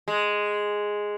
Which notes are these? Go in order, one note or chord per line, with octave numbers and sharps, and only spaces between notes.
G#3